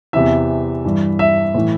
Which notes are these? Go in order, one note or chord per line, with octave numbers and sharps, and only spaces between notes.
E2 C3 E3 E5
G2 E3
E5
A2 E3